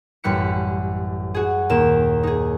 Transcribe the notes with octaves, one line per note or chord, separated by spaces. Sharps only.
A1 F#2 G3 B5 F#6 C#7
F#4 G#4
D#2 A#2 A#3 E7
D#4 G#4